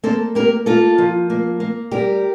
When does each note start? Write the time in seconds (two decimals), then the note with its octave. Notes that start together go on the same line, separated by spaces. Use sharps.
0.03 A#3 A4 C5
0.35 A#3 G4 A#4
0.66 A#3 F4 A4
0.98 F3
1.30 A#3
1.60 A#3
1.91 G3 G4 A#4